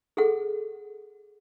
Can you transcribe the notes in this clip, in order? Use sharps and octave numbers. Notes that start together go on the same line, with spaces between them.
G#4 A4 F#5